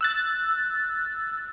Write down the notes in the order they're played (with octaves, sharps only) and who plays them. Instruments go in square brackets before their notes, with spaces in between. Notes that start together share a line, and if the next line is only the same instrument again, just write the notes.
[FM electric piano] E6 F#6 A6